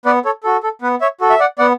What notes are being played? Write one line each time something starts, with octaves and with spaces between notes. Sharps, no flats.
B3 B4 D5
A4 C#5
F#4 A4
A4
B3 B4
C#5 E5
F#4 A4
E5
D5 F#5
B3 D5 F#5